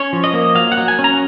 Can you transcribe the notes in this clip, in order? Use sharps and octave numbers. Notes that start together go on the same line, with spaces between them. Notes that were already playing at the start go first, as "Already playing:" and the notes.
Already playing: C#4 C#5
F3
D#5
A#3
F#3 F5
F#5
F#3
G#5
C#4
A#5